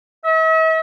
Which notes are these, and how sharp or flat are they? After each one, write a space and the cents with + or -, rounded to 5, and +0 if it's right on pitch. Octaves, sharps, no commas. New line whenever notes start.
E5 -45